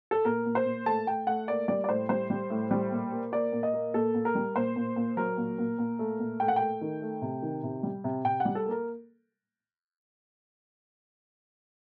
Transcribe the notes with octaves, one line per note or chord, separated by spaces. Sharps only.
A4
A#2 A#4
A#2
C5
A#2
A3 A5
A3 G5
A3 F#5
A#3 D5
G3 D5
D5
A2 C5
G3 C5
G3
A2
G3
A#2
A#3
A#3 D5
A#2
D#5
A#3
A#2 A4
A#2
A#4
G3
A#2 C5
A#2
A#2
F#3 A#4
A#2
A#2
A#2
A3
A#2
A3 G5
F#5
A3 G5
D#3
A3
C3
D#3
C3
G3
C3
C3 G5
F#5
G3
A4
A#3
A#4